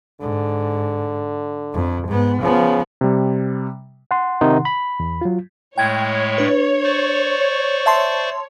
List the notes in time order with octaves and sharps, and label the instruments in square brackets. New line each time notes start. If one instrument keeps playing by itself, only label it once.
[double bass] G#2 [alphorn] D3
[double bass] F2
G#2 B3
[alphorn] C#3 [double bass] F3 B3
[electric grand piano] C3 G3
[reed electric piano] F#5 C6
[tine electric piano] C3 D#3 D#4
B5
[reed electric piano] E2
F#3 F4
[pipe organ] A2 G#3 A3 [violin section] C#5 [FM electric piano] G5 G#6
[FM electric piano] D4 B4
[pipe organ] C5 D5 C#6
[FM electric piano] E5 A5 C6